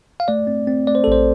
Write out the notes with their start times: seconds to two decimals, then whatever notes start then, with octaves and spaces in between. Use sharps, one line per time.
0.20 F5
0.28 A3 D5
0.47 C4
0.67 C4
0.87 A3 D5
0.95 C5
1.04 A4
1.08 A1 C5